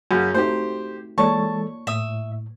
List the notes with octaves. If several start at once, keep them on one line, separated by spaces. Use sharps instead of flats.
F#2 C#3 F#4
A3 C4 D#4 G4 C5
E3 G#3 A#3 A4 C#5 D5 A5 C#6
A2 E5 D#6